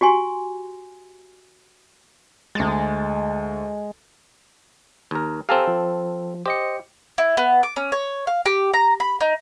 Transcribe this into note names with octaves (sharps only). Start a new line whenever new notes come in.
F#4 G4 G#5 C6
D2 G#3 A6
D#2 A#4
C4 G4 A4 F5 G#5 A#5
F3
G4 C5 D#5 C#7
E4
B3
D6
C#4
C#5
F5
G4
A#5
B5
D#4